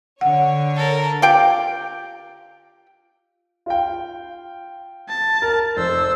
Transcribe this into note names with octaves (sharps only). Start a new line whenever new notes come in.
D3 C#5 F#5
A4 A#4
F4 G4 G5
F4 F5 G5
A5
A#4
F1 C5 E6